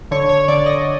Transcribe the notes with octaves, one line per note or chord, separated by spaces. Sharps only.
D3 C#5
C#5
D3 D5
D#5